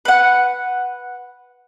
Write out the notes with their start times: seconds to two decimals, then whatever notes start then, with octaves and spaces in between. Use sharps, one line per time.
0.05 B4 F#5